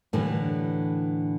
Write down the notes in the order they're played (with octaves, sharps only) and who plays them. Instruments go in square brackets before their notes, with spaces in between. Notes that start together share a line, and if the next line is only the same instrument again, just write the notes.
[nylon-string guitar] A2 D3 E3 G3